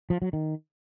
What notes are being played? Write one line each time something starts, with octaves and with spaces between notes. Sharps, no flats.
F3
F#3
D#3